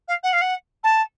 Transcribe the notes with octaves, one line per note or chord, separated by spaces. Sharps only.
F5
F#5
F5
F#5
A5